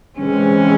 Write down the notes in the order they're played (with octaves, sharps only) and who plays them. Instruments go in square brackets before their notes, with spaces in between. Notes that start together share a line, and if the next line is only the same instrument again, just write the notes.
[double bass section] C3 E3 G#3 C4 [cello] C#4